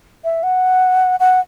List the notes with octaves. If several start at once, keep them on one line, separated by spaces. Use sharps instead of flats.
E5
F#5
F#5